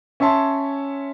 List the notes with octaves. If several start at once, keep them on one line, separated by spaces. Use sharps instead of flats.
C#4 C#5 E5 A5 C6